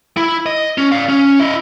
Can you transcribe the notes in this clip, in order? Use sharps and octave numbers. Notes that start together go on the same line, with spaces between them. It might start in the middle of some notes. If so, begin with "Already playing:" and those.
E4
D#5
C#4
D5 F5
C#4
E4 D#5